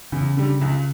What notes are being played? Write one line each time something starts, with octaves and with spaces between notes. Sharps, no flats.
E2 C#3
D3 G3
C#2